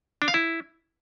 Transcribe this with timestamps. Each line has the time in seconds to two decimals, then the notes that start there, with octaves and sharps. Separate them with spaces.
0.22 D4
0.28 F5
0.34 E4